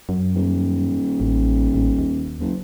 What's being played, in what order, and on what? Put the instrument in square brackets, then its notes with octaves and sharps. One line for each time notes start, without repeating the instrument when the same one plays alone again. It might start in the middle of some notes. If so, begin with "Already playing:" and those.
[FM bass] F#2
[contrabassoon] D#1
[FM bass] A1
A1
D#2
[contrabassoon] F#1